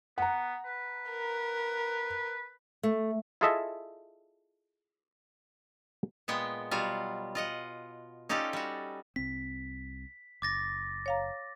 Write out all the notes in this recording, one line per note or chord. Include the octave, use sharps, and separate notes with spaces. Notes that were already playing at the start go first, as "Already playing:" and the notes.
B3 F#5 A#5
B4
A#4
A3
E4 F4 G#4 A4 D#5 E5
A#2 G#3 B3 G5
B2 F#3 G3 F4
F4 D#5 F#5
C#4 D#4 F4 G4 A4 D5
G3 F#4
C2 C4 B6
F#1 D6 A6 A#6
C#5 F5 A#5